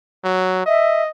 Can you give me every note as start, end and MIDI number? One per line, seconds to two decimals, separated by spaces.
0.24 0.65 54
0.66 1.10 75
0.66 1.02 76